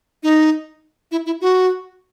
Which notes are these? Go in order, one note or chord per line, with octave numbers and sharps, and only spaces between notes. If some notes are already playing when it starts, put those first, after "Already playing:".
D#4
E4
E4
F#4